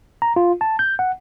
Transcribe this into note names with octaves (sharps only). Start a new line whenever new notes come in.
A#5
F4
A5
G6
F#5